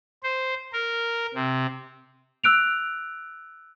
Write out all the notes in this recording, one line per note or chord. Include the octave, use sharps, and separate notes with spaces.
C5
A#4
C3
E6 F#6 D7 F7